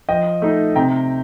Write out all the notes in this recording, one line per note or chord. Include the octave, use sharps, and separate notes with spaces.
F3 D#5 G5
A3 D#4
C3 G5 A#5